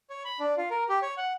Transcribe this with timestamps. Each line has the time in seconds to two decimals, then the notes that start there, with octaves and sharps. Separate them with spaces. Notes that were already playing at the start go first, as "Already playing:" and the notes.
0.10 C#5
0.25 B5
0.40 D4
0.57 F4
0.70 A#4
0.89 G4
1.02 C#5
1.17 F#5